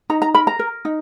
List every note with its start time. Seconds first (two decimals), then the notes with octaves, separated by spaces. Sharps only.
0.10 D#4 A#5
0.22 A#5
0.34 A#4 B5
0.47 A#5
0.59 A#4
0.85 D#4